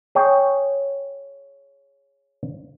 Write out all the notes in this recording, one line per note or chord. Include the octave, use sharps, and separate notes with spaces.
G#4 C#5 G5